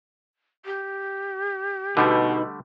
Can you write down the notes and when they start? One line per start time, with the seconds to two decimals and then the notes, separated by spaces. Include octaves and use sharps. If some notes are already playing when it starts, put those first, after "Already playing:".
0.65 G4
1.97 B2 D3 G3 A3 D#4 B4